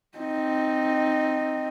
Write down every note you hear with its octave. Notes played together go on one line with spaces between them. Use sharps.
C4 D#4